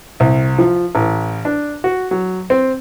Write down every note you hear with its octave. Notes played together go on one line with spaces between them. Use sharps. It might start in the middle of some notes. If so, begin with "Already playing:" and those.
C2
F3
A1
D4
F#4
F#3
C4